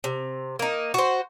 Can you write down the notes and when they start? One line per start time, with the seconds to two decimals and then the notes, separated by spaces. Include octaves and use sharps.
0.04 C3
0.59 A#3 D#4
0.94 F#4 C5